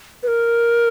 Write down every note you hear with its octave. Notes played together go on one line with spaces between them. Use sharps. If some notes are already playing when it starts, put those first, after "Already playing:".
B4
A#4